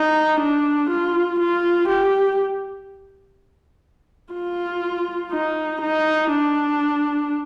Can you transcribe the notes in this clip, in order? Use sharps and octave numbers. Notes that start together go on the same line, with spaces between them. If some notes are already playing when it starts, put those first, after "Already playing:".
Already playing: D#4
D4
F4
F4
G4
F4
D#4
D#4
D4